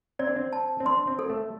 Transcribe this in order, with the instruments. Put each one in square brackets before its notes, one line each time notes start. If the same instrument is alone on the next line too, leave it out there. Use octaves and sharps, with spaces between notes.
[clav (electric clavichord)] C4 [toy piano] D5
[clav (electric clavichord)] D4
C4
[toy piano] A5
[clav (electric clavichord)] C4
[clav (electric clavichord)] D4 [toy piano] C6
[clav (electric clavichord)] C4
[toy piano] A4
[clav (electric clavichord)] A3